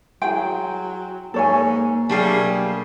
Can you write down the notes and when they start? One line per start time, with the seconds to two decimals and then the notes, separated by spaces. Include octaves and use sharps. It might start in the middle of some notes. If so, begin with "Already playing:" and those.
0.22 F#3 E4 G#4 G5 C6
1.34 G#2 A#3 A4 C#5 G#5
2.09 B2 F#3 G3 A3 A#3 D4 G#4